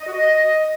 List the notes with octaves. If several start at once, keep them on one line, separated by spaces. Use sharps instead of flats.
D#5
F#4
D#5